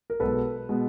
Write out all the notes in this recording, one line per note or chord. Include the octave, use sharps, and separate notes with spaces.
A#4
B1 B2 G#3 A4 B4
B2 G#3